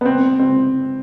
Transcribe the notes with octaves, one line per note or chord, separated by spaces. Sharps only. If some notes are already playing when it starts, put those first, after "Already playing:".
B3
C4
C4